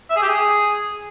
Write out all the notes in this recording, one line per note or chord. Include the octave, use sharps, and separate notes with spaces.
E5
G#4
G4
G#4